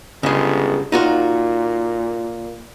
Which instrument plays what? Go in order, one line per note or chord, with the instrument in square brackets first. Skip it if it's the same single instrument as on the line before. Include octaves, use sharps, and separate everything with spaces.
[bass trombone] G1 [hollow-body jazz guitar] C#3 G#3
[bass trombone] A#2 [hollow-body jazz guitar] D#4 F4 F#4